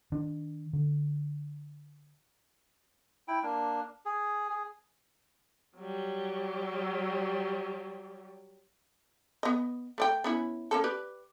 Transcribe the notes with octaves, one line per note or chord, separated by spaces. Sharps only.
D#3 D4
D3
E4 G5
A#3 D4
G#4
G#4
F#3 G3
B3 D#5
A3 D5 G5
B3 C#4 E4
A#3 C#4 A4
G4 B4 D5